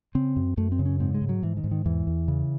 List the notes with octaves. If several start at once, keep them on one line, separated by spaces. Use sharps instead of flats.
C#3 C4
F#2
F#2 A3
C4
C#3
C#4
G#2 C4
G#3
G#2
F#3
G#2 E3
D#3
G#2
D#3
E2 E3
E2
C#3